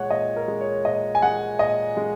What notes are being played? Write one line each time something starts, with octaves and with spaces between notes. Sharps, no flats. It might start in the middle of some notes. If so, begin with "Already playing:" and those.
Already playing: A#2 G#3 C#5 F#5
A#2 D#5
A#4
G#3
C#5
A#2 D#5
G#5
G#3 F#5
A#2 D#5
G#3